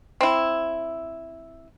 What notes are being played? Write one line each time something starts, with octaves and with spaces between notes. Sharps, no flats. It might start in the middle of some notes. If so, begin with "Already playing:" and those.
C4 E4